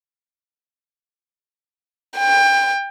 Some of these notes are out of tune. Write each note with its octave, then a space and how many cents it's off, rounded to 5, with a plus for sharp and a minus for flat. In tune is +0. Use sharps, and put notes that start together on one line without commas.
G5 +25